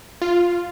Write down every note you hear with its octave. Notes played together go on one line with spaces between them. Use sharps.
F4